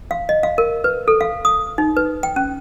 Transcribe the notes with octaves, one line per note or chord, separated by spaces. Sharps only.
F5
D#5
F5
A#4
B4
A4
F5
D#6
D#4
B4
G5
C#4